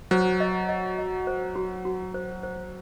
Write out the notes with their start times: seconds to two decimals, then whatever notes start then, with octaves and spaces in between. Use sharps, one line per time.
0.11 F#3 C5
0.40 D#5
0.69 D#5
0.98 D#5
1.27 C5
1.56 F#4
1.85 F#4
2.14 C5
2.43 C5